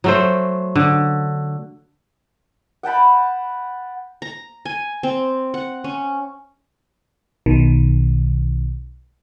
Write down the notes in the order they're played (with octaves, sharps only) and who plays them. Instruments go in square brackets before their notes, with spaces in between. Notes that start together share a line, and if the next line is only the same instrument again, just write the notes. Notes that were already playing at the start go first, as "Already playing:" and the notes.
[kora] F#3 A3 C5
D3
[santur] F#5 G5 A5 B5
[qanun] A#5
G#5
C4
F#5
C#4
[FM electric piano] B1 B2 D#3